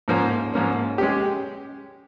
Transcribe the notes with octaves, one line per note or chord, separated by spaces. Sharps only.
G#2 F3 A#3 C#4
G#2 F3 A#3 C#4
G#3 C#4 G4